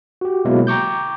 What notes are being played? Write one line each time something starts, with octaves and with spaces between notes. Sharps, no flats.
F#4 G4
B2 F#3 G#3 A#3 E4
G5 A#5 C#6 D6 G6